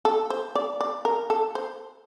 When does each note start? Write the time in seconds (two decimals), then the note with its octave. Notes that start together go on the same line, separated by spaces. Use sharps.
0.05 A4
0.30 C5
0.55 D5
0.81 D5
1.05 A#4
1.30 A4
1.55 C5